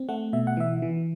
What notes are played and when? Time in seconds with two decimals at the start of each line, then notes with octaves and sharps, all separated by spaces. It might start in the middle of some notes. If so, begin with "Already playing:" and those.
Already playing: C4
0.09 A3 F#5
0.33 B2 E5
0.47 F#5
0.57 E3 E5
0.82 E3